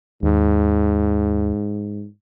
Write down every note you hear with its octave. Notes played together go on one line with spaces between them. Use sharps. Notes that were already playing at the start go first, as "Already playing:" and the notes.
D#2 G#2